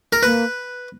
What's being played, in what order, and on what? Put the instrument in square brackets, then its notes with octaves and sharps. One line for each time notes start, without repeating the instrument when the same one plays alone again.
[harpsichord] A#4
[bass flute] A#3 [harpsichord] B4